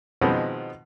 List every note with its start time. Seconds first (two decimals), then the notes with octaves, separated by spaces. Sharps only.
0.21 B2 D#3 F3 G#3 B3 C4